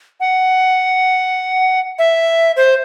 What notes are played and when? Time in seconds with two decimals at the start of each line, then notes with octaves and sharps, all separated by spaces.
0.20 F#5
1.99 E5
2.57 C5